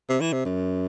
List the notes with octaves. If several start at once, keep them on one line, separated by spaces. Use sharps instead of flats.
C3
E3
C3
F#2